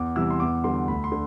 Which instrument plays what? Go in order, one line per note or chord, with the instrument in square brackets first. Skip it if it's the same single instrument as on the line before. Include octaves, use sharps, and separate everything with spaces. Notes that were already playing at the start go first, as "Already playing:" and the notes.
Already playing: [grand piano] E2 D6
C3 E3 G3 E6
C6
E2 D6
D3 G3 C6
D2 B5
C6
D3